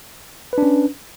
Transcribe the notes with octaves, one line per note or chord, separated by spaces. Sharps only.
C#4 D4 B4